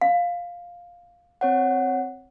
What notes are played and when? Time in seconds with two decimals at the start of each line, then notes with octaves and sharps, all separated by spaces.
0.01 F5
1.41 C4 C#5 F#5